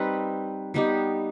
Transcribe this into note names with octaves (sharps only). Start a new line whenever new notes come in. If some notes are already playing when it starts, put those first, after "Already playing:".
Already playing: G3 C4 D#4 B4
G3 B3 D#4 G4